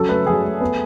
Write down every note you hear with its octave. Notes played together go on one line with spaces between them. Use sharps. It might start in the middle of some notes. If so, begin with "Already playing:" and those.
Already playing: F#3 C#4 A4
A3 B4
F#3 G#4
A3
B3